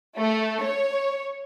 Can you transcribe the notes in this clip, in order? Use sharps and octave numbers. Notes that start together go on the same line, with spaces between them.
A3
C#5